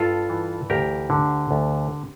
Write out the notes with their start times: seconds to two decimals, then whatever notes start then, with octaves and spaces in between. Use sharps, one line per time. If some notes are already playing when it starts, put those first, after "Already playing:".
Already playing: G2 F4 A4
0.29 E3
0.70 D2 G4 A#4
1.10 D3
1.51 D2